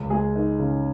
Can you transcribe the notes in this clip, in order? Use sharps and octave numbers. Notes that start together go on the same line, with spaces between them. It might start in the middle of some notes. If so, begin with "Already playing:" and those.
Already playing: C#2
G#3 G#4
D#4
C#3